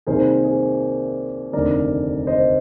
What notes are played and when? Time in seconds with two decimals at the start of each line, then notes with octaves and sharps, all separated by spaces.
0.07 C2 C3 D#3 A#3 G#4 C5
0.44 G#4 C5
1.53 F1 D#2 D3 A#4 D5
2.27 C5 D#5